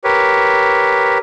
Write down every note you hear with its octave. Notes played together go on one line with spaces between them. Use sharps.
G4 A#4 B4 C#5